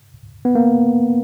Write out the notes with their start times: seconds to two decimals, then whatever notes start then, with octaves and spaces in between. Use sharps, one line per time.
0.45 B3
0.55 A#3